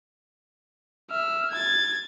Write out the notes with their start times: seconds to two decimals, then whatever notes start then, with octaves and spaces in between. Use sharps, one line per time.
1.11 E5 F6
1.50 G#6 A6